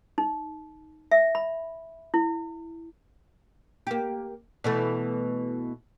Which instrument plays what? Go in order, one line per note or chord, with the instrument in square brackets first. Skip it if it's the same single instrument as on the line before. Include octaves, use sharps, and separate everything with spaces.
[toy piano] D#4
E5
B5
E4
[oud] A#3 G4
B2 E3 A3